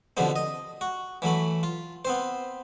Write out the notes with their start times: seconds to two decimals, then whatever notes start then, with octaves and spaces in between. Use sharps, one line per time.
0.17 B2 D3 F3 G3 C4
0.36 D#5
0.81 F#4
1.22 E3 F#3 A3 B5
1.63 F4
2.05 B3 C4 C5